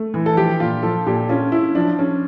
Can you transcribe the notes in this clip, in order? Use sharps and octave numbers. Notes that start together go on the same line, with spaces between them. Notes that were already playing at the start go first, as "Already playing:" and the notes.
Already playing: A3
E3
A4
F3 G4
A#2 F4
F3 A4
A#2 G4
C#4 F4
C#4 E4
F3 D4
C#4